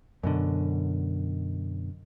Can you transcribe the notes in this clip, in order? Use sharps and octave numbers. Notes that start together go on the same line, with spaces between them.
F#2 B2 D3